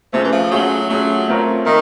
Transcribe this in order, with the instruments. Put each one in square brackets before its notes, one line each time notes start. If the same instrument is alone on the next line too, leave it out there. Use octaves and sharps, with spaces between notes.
[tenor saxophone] C3 [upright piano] A3 C#4 F4 G#4
[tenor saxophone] E3
F3
[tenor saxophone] F#3 [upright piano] A3 C#4 F4 G#4
[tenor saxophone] F#3 [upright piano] A3 C#4 F4 G#4
[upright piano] A3 C4 F4 A#4 C#5
[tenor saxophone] D#3 [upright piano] A3 A#4